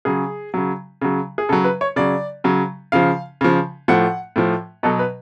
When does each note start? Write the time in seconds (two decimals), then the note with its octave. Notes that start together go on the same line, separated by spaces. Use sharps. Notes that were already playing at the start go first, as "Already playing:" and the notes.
0.05 C#3 F#3 G#4
0.54 C#3 F#3
1.01 C#3 F#3
1.38 G#4
1.49 C#3 F#3 A4
1.64 B4
1.81 C#5
1.96 C#3 F#3 D5
2.44 C#3 F#3
2.92 C#3 F3 F5
3.41 C#3 F3
3.88 A2 F3 F#5
4.36 A2 F3
4.83 B2 F#3 A4
4.99 B4